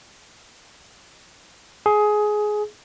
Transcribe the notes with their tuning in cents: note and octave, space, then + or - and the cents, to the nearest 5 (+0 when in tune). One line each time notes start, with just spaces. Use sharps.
G#4 +15